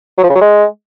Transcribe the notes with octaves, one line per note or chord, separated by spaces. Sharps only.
F#3
F3
C#3
F#3
G#3